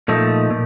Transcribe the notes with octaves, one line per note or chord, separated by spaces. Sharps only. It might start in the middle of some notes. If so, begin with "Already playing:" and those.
A#2 F3 A3 D#4
A#2